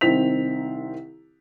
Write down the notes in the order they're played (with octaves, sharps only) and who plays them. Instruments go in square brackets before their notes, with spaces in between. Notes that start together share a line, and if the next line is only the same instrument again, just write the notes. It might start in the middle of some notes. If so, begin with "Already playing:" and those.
[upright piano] C2 D#3 C4 B6 F7